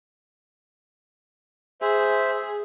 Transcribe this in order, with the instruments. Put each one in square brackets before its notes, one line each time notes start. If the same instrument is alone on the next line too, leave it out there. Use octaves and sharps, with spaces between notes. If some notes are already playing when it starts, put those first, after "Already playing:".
[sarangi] G#4 [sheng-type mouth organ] C5 E5